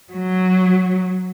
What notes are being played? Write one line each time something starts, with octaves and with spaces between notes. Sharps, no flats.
F#3